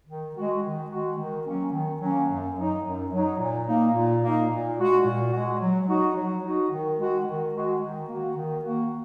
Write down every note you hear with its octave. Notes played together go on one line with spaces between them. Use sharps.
D#3
G#3 F#4
D#3
G#3 F#4
D#3
F#3 A#3 C#4
D#3
F#3 A#3 C#4
F#2
F#3 D#4
F#2
F#3 D#4
A#2
A#3 D#4
A#2
A#3 D#4
A#2
G#3 F#4
A#2
G#3 F#4
F#3
D#4 F#4
F#3
D#4 F#4
D#3
G#3 F#4
D#3
G#3 F#4
D#3
A#3 F#4
D#3
A#3 F#4